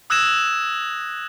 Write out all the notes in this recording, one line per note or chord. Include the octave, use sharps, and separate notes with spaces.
D#6 E6 F#6 G#6 A#6 E7